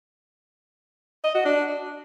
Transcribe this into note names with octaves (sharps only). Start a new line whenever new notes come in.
D#5
F#4
D4